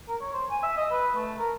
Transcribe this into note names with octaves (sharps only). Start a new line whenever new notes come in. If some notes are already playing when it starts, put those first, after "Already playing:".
A#4
C#5
C5
G#5
E5
D#5
B4
A3
A#4